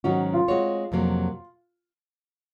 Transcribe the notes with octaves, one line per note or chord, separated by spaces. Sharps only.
G#2 D#3 F#3 C#4 F#4
F4
G#3 C4 F#4 C#5
F2 C3 F#3 A#3